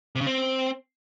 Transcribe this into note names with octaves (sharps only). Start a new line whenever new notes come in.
C3
C#3
C4